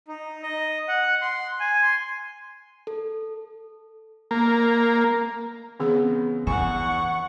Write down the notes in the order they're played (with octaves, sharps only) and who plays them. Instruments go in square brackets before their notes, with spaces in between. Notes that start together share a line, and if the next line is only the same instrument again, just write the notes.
[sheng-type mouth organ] D#4
D#5
F#5
C6
G#5
C6
[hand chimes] A4
[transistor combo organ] A#3
[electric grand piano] C#3 B3 [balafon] E3 C4 G#4
[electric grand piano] E2 [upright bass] E3 [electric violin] F#5 C#6 [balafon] G#5